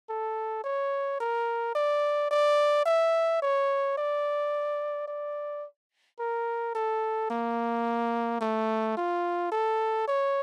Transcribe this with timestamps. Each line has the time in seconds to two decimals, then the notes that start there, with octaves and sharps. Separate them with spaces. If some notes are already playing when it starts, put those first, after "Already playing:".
0.09 A4
0.64 C#5
1.20 A#4
1.75 D5
2.31 D5
2.86 E5
3.42 C#5
3.97 D5
5.08 D5
6.19 A#4
6.75 A4
7.30 A#3
8.41 A3
8.97 F4
9.52 A4
10.08 C#5